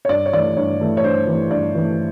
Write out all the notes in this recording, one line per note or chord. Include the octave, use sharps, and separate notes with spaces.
C#5
G2 D5
C#5
E3 A3 D5
G2 C#5
E3 A3
C#5
G2 C5
E3 A3
G2 D5
E3 A3